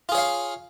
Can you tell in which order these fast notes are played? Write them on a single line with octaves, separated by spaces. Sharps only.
F4 G#4 C#5 F5